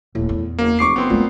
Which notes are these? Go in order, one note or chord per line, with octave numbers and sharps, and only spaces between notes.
D#1 A2
E2
F#1 A#3
F1 C#6 D6 C7
F#1 B3 C4 C6
A#2 A3 C#4